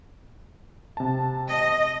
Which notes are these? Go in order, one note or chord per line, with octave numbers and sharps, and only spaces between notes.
C3 A5
D#5